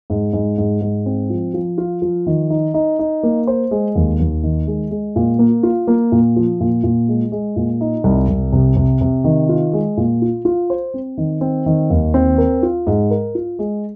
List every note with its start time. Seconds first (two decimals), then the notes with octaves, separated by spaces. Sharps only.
0.10 G#2
0.33 G#2
0.58 G#2
0.81 G#2
1.06 C4
1.30 F3
1.54 F3
1.78 F4
2.02 F3
2.27 D#3
2.50 D#4
2.74 D#4
2.99 D#4
3.23 A#3
3.47 C5
3.71 G#3
3.96 D#2
4.20 D#2
4.43 D#3
4.67 G#3
4.91 G#3
5.16 A#2
5.39 A#3
5.63 F4
5.87 A#3
6.12 A#2
6.36 F3
6.60 A#2
6.83 A#2
7.08 G#3
7.32 G#3
7.56 A#2
7.81 D#4
8.04 C2
8.28 C2
8.53 C3
8.76 C3
9.01 C3
9.24 D#3
9.49 F4
9.73 G#3
9.97 A#2
10.22 F4
10.45 F4
10.70 C5
10.94 C4
11.18 D#3
11.41 C4
11.66 D#3
11.90 D#2
12.14 C4
12.38 A#4
12.63 F4
12.87 G#2
13.11 A#4
13.35 F4
13.59 G#3